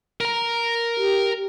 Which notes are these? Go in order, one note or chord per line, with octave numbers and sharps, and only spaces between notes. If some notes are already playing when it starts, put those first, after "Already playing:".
A#4 A#5
G4